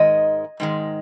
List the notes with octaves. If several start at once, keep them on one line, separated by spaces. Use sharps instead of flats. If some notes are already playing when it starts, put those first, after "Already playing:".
Already playing: G#2 D#3 G#3 D#5
G#2 D#3 G#3